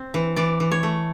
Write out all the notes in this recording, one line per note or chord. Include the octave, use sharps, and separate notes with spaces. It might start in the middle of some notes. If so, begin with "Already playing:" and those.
Already playing: C4
E3
E3 D5
E3
C#5
A3